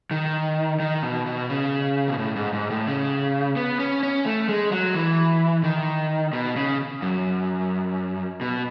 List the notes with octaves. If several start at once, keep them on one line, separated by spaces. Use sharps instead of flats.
D#3
D#3
B2
B2
C#3
B2
A2
G#2
G#2
A2
C#3
B3
C#4
C#4
A3
G#3
F#3
E3
D#3
B2
C#3
F#2
B2